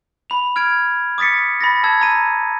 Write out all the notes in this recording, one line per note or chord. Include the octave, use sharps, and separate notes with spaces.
B5 F7
F6 G#6 D7
D6 D#6 A6 B6 C#7
B5 A6 A#6
A5 E6 G#6
A#5 D#7